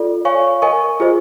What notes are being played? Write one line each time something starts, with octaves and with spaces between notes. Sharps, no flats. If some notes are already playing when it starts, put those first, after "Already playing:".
Already playing: F4 A4 D5
C#5 F5 G#5 C#6
A#4 D#5 G#5 C#6
F4 G#4 C5 D#5